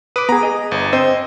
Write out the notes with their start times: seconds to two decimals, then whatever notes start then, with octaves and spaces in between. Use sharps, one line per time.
0.16 B4 D6 D#6
0.29 B3 G#4 A#5
0.43 G#4 D#5
0.71 G1
0.93 C4 C5 D#5 E6